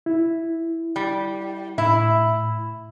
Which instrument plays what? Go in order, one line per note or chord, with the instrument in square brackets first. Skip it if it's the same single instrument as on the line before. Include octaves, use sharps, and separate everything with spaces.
[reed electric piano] E4
[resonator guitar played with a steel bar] G3
[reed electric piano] A2 B5 [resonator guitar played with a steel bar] E4